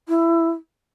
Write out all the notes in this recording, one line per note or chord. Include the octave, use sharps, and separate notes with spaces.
E4